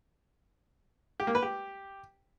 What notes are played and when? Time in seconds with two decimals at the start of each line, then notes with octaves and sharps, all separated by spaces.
1.20 G4
1.27 A#3
1.35 B4
1.42 G4